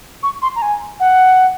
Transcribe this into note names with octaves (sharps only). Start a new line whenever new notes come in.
C#6
C6
A#5
G#5
F#5